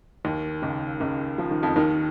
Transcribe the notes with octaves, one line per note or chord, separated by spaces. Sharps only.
D#2 D#3
C#2 C#3
C#2 C#3
F3
D#3
F2 F3
D#2 D#3